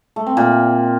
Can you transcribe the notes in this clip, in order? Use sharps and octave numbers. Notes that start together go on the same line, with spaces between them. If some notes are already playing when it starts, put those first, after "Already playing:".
A3
C4
A#2